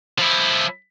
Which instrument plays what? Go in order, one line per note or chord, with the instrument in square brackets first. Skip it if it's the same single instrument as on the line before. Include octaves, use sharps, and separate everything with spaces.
[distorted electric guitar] F3 E4